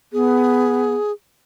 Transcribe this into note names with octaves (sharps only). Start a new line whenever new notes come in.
B3 G#4